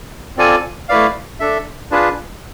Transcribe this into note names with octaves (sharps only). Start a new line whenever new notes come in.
C4 F4 A4 D5 G#5
A3 E4 B4 D5 F5
D4 A4 E5
D4 F4 G#4 B4